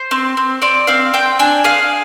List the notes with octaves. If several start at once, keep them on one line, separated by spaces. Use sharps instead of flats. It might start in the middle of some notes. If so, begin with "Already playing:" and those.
Already playing: C5
C4
C4
C4 D5
C4 F5
C4 G5
D4 G#5
G#4 F5